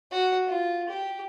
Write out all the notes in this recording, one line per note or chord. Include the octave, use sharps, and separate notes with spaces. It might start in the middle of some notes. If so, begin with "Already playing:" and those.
F#4
F4
G4